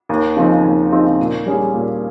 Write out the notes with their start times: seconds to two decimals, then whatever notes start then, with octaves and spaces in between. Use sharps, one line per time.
0.09 D#2
0.37 C#3 F3 C4 D#4
0.64 D#2
0.91 C#3 F3 C4 D#4
1.19 A#2
1.46 G3 C#4 G#4
1.74 A#2